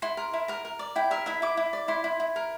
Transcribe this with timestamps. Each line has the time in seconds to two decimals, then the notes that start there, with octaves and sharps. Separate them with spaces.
0.02 E4 C6
0.17 A#4
0.34 E4
0.48 A#4 A#5
0.65 A#4
0.79 D5
0.96 E4 G5
1.11 A#4 E5
1.26 E4 E5
1.42 E4 D6
1.57 E4
1.73 D5
1.88 E4 C6
2.04 E4
2.20 E4
2.36 A#4